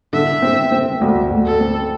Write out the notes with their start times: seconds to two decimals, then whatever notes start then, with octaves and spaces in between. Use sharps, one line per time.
0.13 D3 E5
0.42 C4
0.72 C4
1.01 D2
1.30 D2
1.45 A4
1.60 C4